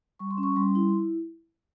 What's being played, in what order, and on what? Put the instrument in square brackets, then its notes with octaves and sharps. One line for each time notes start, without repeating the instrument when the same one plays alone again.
[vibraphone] G3 C#6
C6
C#4
C#6
G3 C6
E4